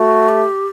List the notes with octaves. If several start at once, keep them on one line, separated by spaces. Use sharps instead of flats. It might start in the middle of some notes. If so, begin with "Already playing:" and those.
Already playing: A3 F#4
G4